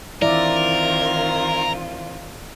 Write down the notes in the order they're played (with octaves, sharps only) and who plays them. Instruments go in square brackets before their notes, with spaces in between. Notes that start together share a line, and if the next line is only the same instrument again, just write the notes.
[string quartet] D#3 C4 F4 [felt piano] E3 [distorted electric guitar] A#4 [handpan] D5 E5